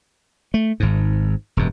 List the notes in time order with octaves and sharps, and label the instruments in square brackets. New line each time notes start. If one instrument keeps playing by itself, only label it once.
[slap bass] A3
G#1 G#2
E1 G2